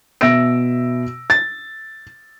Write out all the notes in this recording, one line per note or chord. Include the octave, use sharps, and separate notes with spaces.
B2 E5 E6 A#6 D7
A6